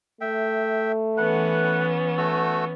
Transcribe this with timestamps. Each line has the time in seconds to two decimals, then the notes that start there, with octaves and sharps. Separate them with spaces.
0.21 A3 E5 G5
1.17 E3 B3 C#4 B4 F#5
2.18 A3 F#4 E6